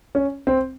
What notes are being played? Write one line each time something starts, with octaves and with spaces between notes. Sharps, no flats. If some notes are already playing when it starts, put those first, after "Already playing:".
C#4
C4